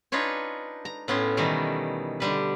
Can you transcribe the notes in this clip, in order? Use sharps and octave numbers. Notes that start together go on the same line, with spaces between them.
D4 D#4 F4 B4 C#5 G#5
A#5
A2 B3 C#4 C6
B2 D#3 E3 G3 A3
D3 G3 B4